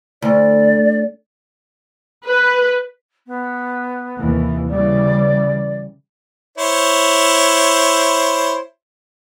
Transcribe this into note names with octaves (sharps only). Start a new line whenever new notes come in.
D2 D5
B4
B3
D#2 C3 E3
C#3 E3 G3 D5
E4 C5 C#5